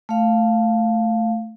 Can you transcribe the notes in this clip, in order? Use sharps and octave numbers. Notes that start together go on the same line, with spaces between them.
A3 F5